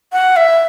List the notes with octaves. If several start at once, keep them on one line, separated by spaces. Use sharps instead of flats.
F#5
E5